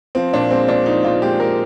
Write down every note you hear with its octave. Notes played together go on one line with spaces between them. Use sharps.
F3 C4
A#2 D4
G#3 C4
A#2 D4
F3 D#4
A#2 F4
G#3 G4
A#2 A#4